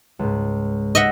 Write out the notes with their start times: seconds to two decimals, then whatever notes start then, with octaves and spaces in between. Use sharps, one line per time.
0.19 C#2 G#2
0.95 D#5 E5 F#5 G6